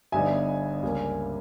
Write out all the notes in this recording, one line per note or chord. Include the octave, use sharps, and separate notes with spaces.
G1 G2 G3 B3 D#4 E5 G#5
C#2 C#3 G3 A#3